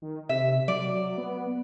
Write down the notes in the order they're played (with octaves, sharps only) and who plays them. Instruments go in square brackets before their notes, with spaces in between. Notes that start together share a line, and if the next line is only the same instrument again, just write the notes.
[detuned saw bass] D#3
[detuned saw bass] C3 [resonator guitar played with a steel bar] E5
[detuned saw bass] F#3 [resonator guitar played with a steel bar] D5
[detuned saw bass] B3